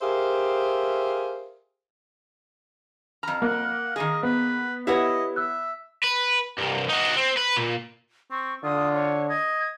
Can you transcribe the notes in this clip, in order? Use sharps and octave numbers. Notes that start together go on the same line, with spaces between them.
G4 G#4 A#4 C5 E5 F5
F2 A#5 F6
A#3 F#5
D#3 A#3 G#4 D#5
B3 B4
E4 G4 B4 C#5 D#5 F#5
E5 E6 F#6
B4
C2 G2
D#4 F#4
C4
B4
A#2
C4 C#6
D3 F4 D#6
C#5
D#5 G#6